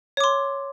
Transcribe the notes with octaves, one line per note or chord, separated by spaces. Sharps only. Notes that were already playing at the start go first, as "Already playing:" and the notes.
C#5 C6 D6